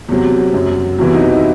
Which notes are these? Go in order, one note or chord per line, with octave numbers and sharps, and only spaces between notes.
E2 C3 F#3
F#2 F#3
E2 C3 E3 F#4
E4
D#4
E4